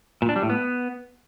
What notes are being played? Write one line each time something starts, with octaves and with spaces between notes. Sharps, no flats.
A#2
D4
G3
A2
B3